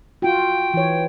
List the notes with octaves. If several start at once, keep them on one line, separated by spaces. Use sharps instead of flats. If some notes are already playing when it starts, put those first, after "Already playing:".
F4 F#4 G5
E3 C#5